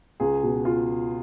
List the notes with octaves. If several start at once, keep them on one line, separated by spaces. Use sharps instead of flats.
C#2 G#4
B2
F4